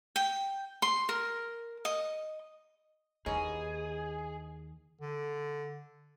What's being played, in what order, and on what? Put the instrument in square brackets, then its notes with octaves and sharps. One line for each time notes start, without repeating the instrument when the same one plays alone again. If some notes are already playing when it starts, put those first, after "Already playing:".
[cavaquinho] G5
C6
A#4
D#5
[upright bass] D#2 A#3 [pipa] E3 C#4 D#4 [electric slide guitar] G#4
[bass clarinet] D3